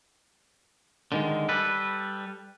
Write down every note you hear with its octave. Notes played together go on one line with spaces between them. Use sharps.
D3 D#3 G#3
G3 A4 B4